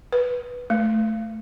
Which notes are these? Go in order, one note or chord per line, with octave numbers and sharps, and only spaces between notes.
B4
A3